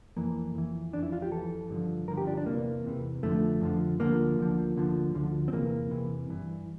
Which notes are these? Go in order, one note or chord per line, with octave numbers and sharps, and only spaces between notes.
F2 E3 A#3
F2 E3
E3 D4
F2 E4
F4
G4
F2 E3 A4
G2 D3 F3
G2 D3 F3 A#4
G4
D4
D4
E2 C3 E3 A#3
E2 C3 E3
F2 D3 F3 A3
F2 D3 F3
D2 D3 F3 A#3
D2 D3 F3
D2 D3 F3
D2 D3 F3
C4
E2 C3 E3 A#3
E2 C3 E3
G2 E3